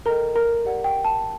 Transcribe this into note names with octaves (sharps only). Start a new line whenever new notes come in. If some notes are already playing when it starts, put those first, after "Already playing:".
A4 A#4 D#5 G5 A#5
A#4 A#5
G4 D5 F#5
G5
A5